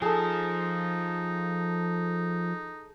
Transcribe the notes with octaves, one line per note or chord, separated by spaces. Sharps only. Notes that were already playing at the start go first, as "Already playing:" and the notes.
F3 D#4 G#4 A4